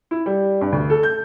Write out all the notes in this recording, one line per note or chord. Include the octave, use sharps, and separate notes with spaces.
E4
G3
G2
D2
A4
G6